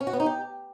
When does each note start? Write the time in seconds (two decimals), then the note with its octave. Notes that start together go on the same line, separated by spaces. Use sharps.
0.01 C#4
0.07 F#4
0.13 B3
0.20 D#4
0.26 G4